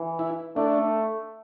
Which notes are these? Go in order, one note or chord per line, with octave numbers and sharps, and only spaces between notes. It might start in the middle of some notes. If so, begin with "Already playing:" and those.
Already playing: E3
E4
A3 D4